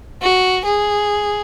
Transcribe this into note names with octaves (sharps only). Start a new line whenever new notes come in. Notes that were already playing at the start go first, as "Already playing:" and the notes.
F#4
G#4